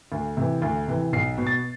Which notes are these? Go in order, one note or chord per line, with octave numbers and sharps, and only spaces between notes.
D2
C3 E3
D2
C3 E3
B1 C7
B2 B3
A6